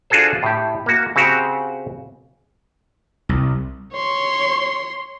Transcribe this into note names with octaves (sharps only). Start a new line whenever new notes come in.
D4 F4 F#4 G#4 A4 C5
A2 G4
A#3 F#4
C#3 C4 F#4 G4
C2
C#5 C6